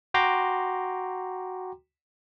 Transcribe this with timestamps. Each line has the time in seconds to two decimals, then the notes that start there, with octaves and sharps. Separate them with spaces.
0.14 F#4 G5 A#5 C6 D6